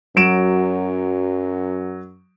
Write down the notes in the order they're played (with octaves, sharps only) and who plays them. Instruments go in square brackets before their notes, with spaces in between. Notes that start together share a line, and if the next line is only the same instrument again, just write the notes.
[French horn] F#2 [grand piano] F#3 D7 E7